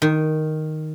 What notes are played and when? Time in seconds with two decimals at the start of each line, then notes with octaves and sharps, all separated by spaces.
0.02 D#3